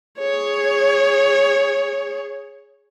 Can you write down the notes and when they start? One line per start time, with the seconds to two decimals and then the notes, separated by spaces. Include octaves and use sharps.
0.19 G#4 C#5